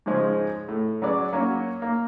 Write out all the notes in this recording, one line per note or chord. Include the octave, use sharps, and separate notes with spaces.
G#2 C#3 F3 G#3
A2
F#3 C#4 G#4 B4 D5
F#3 A#3 C#4
A#3